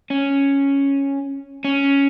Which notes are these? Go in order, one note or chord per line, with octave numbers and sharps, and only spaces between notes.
C#4
C#4